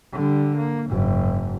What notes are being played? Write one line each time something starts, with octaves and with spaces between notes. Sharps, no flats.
D3 G3
A#3
F#1 G#2